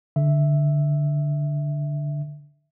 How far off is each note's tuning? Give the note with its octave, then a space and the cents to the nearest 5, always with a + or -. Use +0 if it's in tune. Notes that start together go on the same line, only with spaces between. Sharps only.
D3 +0 E5 +0